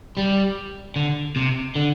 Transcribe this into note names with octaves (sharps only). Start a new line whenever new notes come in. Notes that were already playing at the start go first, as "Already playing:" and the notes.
G3
D3
C3
D3